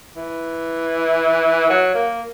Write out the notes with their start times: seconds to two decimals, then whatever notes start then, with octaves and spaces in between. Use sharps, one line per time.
0.16 E3
1.70 F#3
1.95 A#3